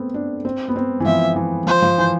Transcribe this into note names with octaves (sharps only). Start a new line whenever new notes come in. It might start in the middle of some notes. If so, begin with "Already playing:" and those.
Already playing: A3 B3 C4
D4
C4
B3
C4
E3
F3 E5
E3
F3 C5
F3
E3